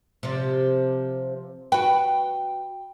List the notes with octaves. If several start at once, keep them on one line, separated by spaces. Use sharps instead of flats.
C3 F3
F#4 B4 G5